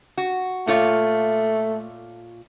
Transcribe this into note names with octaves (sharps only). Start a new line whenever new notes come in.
F#4
A#2 A3 F4 C#5